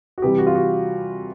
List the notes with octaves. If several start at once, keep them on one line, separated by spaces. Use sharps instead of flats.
F#4
C3 E3 G3 G4
F#4
F4
F#4